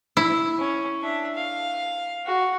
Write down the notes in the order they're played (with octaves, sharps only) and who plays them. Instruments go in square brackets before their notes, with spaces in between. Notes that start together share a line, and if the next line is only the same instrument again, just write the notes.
[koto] E4
[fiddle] C#4
D4 E5
F5
F#4